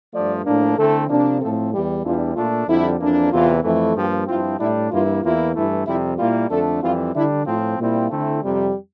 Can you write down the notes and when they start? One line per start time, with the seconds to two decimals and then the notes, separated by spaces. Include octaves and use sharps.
0.12 G2 F3 A3 D5
0.45 A2 F3 A#3 D4
0.77 D3 A3 C4 E4 A4
1.08 C3 F3 A#3 D4
1.40 A2 F3 A3 C4 A4
1.72 E2 E3 G3 G4
2.04 E2 E3 G3 D4 F4
2.35 A#2 A3 D4 F4
2.67 F2 D3 G3 D4 E4
2.99 F2 E3 A#3 D4
3.31 E2 C3 E3 F4
3.63 F2 E3 A3
3.95 G2 F3 A#3 G4
4.27 G2 F3 C4 E4 F4
4.58 A2 G3 D4 E4
4.90 G2 E3 A#3 E4 F4
5.22 E2 E3 A#3 E4 F4
5.54 G2 E3 A3 E4
5.86 F2 C3 G3 E4
6.18 A#2 G3 A#3 E4 F4
6.50 F2 D3 A3 D4 A4
6.81 F2 E3 G3 C4 F4
7.13 D3 G3 D4 E4
7.45 A2 F3 C4 F4
7.78 A#2 G3 C4 E4 F4
8.09 D3 A3 C4 E4
8.42 F2 C3 G3